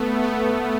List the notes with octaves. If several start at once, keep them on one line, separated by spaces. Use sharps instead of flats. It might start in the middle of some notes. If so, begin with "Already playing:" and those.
Already playing: A3 B3
B3